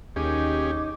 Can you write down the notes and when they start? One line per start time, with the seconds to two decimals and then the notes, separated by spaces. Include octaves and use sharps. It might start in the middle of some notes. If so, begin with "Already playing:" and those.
0.16 D#2 C#4 D#4 G4 G#4 D6